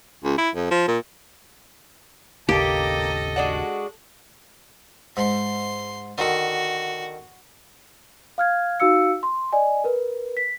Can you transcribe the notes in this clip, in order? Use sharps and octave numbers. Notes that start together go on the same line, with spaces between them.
C#2
E4
F2
F3
A#2
G#1 D#2 C#3 A#3 G4 A4 D#5
G#3 D4 F#4
G#2 C6
D3 D#3 F#4
F5 F6 G#6
D#4 F#4 F5 E6 C#7
C6
D5 D#5 G#5
A#4 B4
B6